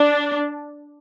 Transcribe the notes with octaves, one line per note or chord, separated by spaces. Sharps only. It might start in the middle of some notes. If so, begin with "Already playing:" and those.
Already playing: D4